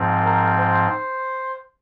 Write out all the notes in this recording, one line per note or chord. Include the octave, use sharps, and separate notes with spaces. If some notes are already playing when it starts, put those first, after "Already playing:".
Already playing: G#2 F3 C4
A#4
C5